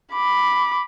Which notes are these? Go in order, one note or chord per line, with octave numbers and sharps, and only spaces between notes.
B5 D6